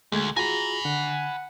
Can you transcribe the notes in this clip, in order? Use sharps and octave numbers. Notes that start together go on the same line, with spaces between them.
D2 G#3 A3 G#6
F4 F#4 G#4 G#5 A#5 B5
D3 F#5